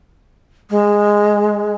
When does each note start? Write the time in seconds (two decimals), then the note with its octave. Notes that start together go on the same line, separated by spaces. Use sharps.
0.70 G#3